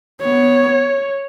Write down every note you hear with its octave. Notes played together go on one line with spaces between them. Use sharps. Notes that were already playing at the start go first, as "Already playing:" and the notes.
B3 C#5